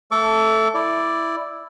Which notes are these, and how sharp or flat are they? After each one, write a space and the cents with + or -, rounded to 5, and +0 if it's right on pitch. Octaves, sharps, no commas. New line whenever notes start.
A3 +5 A4 +0 D6 -45
E4 +0 D5 +0